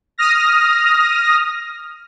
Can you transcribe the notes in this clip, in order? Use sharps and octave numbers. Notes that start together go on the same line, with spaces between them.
D#6 F6 A#6